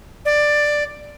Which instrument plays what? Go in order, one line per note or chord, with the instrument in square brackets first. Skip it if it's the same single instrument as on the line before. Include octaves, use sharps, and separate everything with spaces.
[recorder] D5